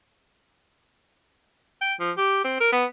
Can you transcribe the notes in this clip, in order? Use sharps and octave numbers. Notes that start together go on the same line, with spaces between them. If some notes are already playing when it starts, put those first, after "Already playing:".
G5
F3
G4
C4
A#4
B3